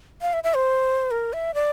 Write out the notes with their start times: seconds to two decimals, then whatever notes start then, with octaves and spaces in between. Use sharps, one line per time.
0.22 F5
0.33 E5
0.44 E5
0.54 C5
1.11 A#4
1.33 E5
1.54 D5